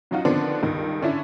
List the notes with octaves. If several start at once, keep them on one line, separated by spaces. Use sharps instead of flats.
F#3 C#4 D#4 F4 F#4
D3 D#3 F3 B3 C4 D4
C#2 G2 D#3
D3 C#4 D4 E4